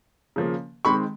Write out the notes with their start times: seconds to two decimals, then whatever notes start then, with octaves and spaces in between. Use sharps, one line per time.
0.36 C#3 F3 A#3
0.85 D#3 G#3 C4 B5 C#6